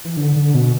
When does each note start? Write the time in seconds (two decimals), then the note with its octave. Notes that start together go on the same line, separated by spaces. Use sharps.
0.05 E3
0.17 D3
0.36 D3
0.55 B2